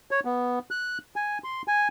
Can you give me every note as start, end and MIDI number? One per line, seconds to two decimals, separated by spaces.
0.11 0.20 73
0.25 0.59 59
0.71 0.98 90
1.16 1.38 80
1.44 1.62 84
1.68 1.88 80